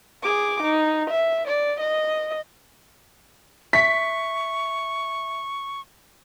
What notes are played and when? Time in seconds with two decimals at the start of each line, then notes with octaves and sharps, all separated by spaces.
0.23 G#4 D6
0.62 D#4
1.10 E5
1.48 D5
1.80 D#5
3.73 E5 C#6 B6